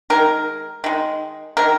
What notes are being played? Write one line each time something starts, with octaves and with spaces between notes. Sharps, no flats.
D#3 G#3 A#4
D#3 G#3
D#3 G#3 A#4